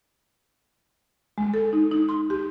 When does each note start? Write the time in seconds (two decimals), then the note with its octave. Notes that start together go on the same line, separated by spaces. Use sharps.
1.38 G#3
1.54 A4
1.73 D#4
1.91 D#4
2.09 C6
2.30 G4